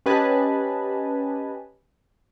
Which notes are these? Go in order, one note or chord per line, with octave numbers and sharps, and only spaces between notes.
C#4 G4 B4 D#5 G#5 A5